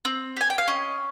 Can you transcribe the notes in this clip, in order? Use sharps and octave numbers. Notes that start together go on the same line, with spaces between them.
C4
G4 G#5
G5
F5
C#4 D#5